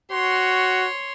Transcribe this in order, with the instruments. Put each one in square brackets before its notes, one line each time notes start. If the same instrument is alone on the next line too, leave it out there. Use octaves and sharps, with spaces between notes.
[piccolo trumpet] F#4 [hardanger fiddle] C#5 C6